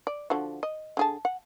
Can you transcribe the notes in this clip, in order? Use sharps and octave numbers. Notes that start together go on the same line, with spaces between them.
D5
D3 F3 F#4
D#5
D3 G#4 A5
F#5